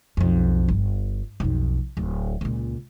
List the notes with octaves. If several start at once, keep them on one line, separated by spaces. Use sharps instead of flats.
B1 F2
G1
B1 F2
D1
C#2 A#2